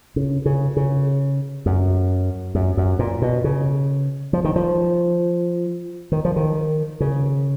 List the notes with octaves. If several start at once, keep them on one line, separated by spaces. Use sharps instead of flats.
C#3
C#3
C#3
F#2
F#2
F#2
A#2
B2
C#3
F3
D#3
F3
D#3
F3
D#3
C#3